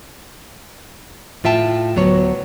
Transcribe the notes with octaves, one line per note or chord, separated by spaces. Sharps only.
A2 F4 E5 G5 A5
D2 F#3 B3 C#5